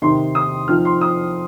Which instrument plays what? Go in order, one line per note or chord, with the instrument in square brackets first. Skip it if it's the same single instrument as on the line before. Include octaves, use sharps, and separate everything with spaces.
[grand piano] C3 D#3 C4 D#4 C6
D#6
F3 C4 D#4 F6
C6
D#6